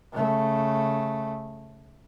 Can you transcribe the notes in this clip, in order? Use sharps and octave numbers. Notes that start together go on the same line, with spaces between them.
C#3 A3